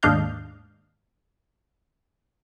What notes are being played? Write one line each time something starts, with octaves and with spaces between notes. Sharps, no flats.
D#2 G#2 D4 D#5 F5 G6